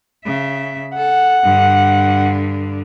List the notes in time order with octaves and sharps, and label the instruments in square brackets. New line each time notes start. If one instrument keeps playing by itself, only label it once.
[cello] C#3 E5
[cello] A4 [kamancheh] F#5
[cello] G2 D3